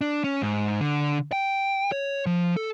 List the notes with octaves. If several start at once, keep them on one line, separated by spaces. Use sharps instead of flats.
D4
C#4
G#2
D3
G5
C#5
F3
A4